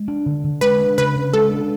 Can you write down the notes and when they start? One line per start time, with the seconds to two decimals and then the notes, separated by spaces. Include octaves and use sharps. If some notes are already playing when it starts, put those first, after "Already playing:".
Already playing: G#3
0.08 D4
0.26 D3
0.44 D3
0.61 G#3 B4
0.80 D4
0.98 C#3 B4
1.16 C#3
1.33 G#3 A4
1.51 D4